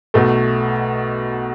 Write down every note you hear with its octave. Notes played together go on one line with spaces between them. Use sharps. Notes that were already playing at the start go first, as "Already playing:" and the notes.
B1 B2 A3